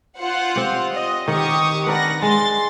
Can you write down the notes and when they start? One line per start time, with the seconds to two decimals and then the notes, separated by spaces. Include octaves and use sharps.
0.19 F4 C5 F#5
0.56 C4 G4
0.92 D#5
1.28 D#3 G4 F#5 C#6 D#6
1.87 D4 A#4 B4 F#5 A#6
2.22 G#3 C6 A6